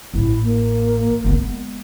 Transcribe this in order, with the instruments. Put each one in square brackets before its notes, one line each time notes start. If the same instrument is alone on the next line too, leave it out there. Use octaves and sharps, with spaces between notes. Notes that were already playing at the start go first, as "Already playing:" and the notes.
[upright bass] A1 [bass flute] E4
[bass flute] A#3
[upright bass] G#3 B3